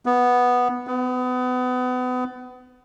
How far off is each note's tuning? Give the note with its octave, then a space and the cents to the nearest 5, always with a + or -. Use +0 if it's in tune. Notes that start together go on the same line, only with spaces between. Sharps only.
B3 -5
B3 +30